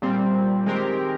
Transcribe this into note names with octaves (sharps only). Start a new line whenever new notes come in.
A#2 G3 C4
D#3 G#3 C4 G4 A#4